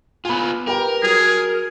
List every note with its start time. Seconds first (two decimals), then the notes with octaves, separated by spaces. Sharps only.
0.25 B3 F4 G#5 B5
0.67 G4 A#4 B4 G5
1.03 F#3 G#4